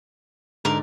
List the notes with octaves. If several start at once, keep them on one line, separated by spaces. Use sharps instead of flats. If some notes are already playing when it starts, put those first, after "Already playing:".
G#2 D3 A#4 D5